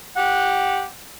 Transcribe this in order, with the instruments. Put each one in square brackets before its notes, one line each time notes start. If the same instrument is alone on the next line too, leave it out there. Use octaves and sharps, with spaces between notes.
[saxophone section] G4 F#5